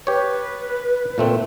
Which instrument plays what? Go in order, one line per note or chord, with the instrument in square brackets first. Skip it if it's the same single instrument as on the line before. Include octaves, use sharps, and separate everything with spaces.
[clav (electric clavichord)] G4 C#5 [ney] B4
[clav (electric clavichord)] A#2 A3 C4